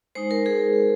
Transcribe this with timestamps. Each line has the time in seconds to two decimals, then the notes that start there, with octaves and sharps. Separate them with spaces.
0.15 G#3 D#4 C5
0.31 A#4
0.46 G#4